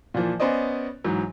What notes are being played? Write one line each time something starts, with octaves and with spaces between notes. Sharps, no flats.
A#2 E3 F3
B3 C#4 C5 D5 D#5
G#2 E3 F#3